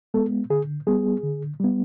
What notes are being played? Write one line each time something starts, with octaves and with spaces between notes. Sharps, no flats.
G#3 B3 A4
D3 G#4
G3 B3 G#4
D3
G3 B3